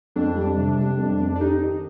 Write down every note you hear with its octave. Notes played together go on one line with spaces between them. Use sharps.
F2 D4
G3
C3
G3
F2
F2
D4
D#4 G4
D#3